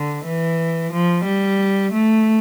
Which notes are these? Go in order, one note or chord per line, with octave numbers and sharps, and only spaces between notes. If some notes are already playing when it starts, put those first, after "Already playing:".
Already playing: D3
E3
F3
G3
A3